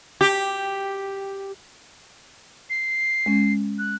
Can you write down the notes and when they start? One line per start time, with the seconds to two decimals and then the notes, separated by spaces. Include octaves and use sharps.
0.21 G4
2.70 C7
3.26 G#3 C#4
3.79 F#6